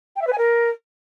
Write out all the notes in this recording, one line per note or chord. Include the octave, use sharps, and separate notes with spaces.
G5
E5
B4
G#5
A#4